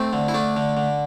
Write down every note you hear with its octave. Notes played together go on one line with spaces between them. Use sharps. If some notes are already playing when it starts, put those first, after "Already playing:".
Already playing: A3 C4
D3
E4
A3 D4
D3
D3